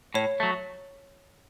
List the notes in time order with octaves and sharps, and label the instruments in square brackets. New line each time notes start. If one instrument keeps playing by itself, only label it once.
[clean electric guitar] A2 [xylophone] C#5
[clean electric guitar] F#3 A3